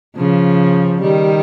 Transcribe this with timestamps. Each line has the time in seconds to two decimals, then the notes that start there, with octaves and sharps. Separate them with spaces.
0.16 C#3 F3
1.01 D#3 G3